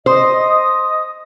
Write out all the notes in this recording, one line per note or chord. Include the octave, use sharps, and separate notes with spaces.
C5 D#5 D#6